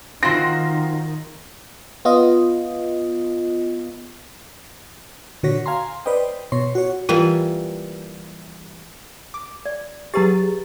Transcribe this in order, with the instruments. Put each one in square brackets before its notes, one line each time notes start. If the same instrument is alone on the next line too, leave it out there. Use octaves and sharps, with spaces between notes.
[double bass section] D#3 [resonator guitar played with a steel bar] C4 F4 F#4 [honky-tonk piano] C6 A#6
[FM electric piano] B3 F4 D#5
A#2 D3 F#4 C#5 A#6 B6
F5 G#5 A#5 C6
B4 C5 D5 D#5 G5
B2 C#5 C6
F#4 C#5
[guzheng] E3 G3 A#3 [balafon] F4
[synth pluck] D6
[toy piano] D5
[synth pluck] F#3 G#4 A6 [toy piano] G4 B4 A#5